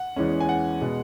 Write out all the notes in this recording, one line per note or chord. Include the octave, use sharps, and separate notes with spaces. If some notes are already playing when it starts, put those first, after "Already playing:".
Already playing: F#5
E2 E3 G#3 C#4
G#5
F#5
B2 G#3